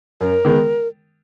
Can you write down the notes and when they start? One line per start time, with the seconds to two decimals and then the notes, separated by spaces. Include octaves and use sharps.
0.21 F#2 A#4
0.45 D#3 G#3 B3